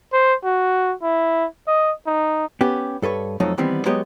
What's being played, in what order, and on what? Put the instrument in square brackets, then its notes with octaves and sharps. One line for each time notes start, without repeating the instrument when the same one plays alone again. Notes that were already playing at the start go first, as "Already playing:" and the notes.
[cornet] C5
F#4
E4
D#5
D#4
[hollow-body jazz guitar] B3 C#4 G4
G2 A4 B4 C#5
F2 F3 F#3 A3 D#4 A4
D#3 E3 G3 B3 C4
F#3 G#3 B3 G4 C#5 D#5